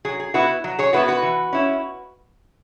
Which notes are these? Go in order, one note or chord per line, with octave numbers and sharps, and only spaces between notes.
F#3 G#4
G#4
B3 E4 F#4 B4
F#3
G#4 C#5
B3 E4 F#4 B4
F#4 B4
E3
C#4 E4